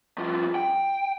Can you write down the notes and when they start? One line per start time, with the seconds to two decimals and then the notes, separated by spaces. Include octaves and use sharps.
0.18 G2 F3
0.55 G5